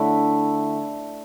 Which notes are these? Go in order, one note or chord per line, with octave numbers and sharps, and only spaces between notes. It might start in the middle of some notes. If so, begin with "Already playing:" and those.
Already playing: D3 A3 E4